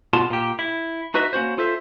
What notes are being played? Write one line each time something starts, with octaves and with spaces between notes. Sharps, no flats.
B2 F4 A5
A#2 G4
E4
D#4 F#4 B4 D#5 E5
A#3 C#4 F#4 C5
F4 A4 C5 E5